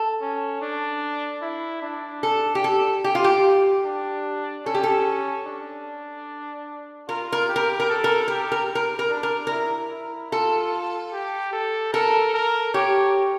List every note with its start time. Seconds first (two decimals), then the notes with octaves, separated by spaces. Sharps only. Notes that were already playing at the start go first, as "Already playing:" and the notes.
Already playing: A4
0.22 C#4
0.62 D4
1.42 E4
1.82 D4
2.23 A4
2.55 G4
2.64 A4
3.04 G4
3.15 F4
3.24 G4
3.85 D4
4.66 C#4 A4
4.74 G4
4.83 A4
5.47 D4
7.08 F4 A#4
7.32 A#4
7.49 G4
7.56 A#4
7.80 A#4
7.89 A4
8.04 A#4
8.28 G4 A#4
8.52 A#4
8.75 A#4
8.99 A#4
9.10 D4
9.23 A#4
9.47 E4 A#4
9.91 E4
10.32 F4 A4
11.13 G4
11.53 A4
11.93 A4 A#4
12.34 A#4
12.74 G4 C#5